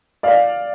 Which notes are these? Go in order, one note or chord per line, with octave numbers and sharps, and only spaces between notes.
D5 F5